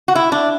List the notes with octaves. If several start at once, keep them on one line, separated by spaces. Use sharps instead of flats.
F#4
E4
D4